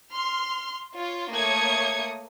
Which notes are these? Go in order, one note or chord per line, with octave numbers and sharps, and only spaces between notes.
C6 F6
F4 C#5
A3 A#3 C#5 D#6 G#6 C#7